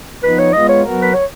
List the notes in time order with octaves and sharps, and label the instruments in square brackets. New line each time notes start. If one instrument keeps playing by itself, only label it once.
[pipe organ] F3 B3 D#4 [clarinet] B4
[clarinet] C#5
[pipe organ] G#3 B3 F4 [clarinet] D#5
[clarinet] C#5
[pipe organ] F#3 B3 F#4 A#4
[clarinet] B4
C#5